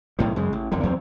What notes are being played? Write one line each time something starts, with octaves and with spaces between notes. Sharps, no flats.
B1 A2 D#3
F#2 C#3 G#3
A1
G1 F2 D3 D#3
E2 F#3 B3 C4